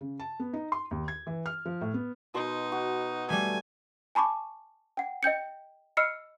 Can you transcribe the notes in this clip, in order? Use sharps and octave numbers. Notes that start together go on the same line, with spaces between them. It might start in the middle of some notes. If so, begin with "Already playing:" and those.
C#3
A5
B3
D#4
C6
D#2
G#6
E3
F6
F3
A2
B3
B2 D#4 F#4 C6
F#4
G3 A3 G#5
G#5 A5 B5 C#6 D6
F#5 G5
D#5 G5 G6 C#7
D#5 B5 E6 F6 C7 C#7